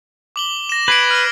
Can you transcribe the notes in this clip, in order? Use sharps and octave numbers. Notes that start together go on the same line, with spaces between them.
D6 F#7 G7
A#6 E7
B4 G#6 C7 D7
F6 F#7